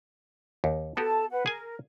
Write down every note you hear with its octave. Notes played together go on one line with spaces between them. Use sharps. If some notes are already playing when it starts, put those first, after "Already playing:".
D#2
B3 F#4 G4 A4 A5
B4 F#5
G#4 A#4 G#5